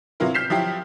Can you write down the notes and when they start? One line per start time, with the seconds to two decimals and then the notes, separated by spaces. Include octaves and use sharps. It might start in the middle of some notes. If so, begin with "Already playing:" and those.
0.20 C3 F#3 B3 E4 F4 A#4
0.34 F6 G6 B6 C7 E7
0.50 F3 F#3 E4 G4